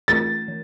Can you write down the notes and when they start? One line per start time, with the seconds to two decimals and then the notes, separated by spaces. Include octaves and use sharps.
0.08 E3 A3 C#4 F4 A#4 A6
0.48 E3